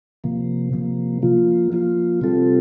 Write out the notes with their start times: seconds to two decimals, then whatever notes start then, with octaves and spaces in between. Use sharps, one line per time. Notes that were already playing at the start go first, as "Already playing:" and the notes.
0.24 C3 F3 A#3
0.73 C3 F3 A#3
1.22 F3 A#3 F4
1.72 F3 A#3 F4
2.21 C3 G3 C4 F4 A4